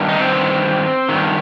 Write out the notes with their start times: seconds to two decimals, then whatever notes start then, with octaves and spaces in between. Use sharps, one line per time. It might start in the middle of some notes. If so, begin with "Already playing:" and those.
Already playing: G2 D#3
0.09 D#4
0.19 C4
1.09 G2 D#3